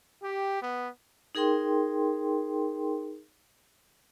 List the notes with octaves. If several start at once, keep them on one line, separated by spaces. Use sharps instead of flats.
G4
B3
D#4 G#4 A#4 G5 C6